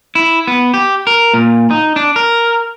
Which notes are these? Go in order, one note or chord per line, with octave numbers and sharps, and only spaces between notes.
E4
B3
G4
A#4
A#2
D#4
D4
A#4